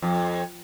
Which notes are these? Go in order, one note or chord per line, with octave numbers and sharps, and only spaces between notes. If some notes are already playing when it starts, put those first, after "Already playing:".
F2